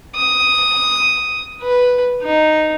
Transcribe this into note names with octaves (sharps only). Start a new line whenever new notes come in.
D#6
B4
D#4